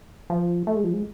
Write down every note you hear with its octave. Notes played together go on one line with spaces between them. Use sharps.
F3
A3
G#3
F3
G#3